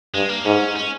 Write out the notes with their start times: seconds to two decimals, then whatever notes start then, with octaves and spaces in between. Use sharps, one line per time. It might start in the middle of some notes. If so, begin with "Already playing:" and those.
0.14 G2 G#3
0.29 A#3
0.45 G#2 C#4
0.76 C#4